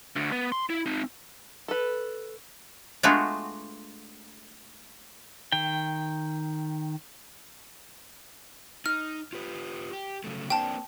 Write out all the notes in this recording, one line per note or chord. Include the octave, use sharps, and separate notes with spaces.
D2 D3
B3
C6
E4
C4 D#4
A4 B4
G#3 A3 B3 D4 F4 F#4
D#3 G5
D#4 F6
F4 G4 B4
G4
C#3 F#3 A3
A#3 C4 D4 G5 A5